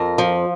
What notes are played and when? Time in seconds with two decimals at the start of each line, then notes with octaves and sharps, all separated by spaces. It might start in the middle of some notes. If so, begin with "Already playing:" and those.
Already playing: F2 A#4
0.18 F3